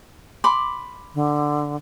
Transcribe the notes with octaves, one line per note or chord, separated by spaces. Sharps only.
B5 C6 D6
D3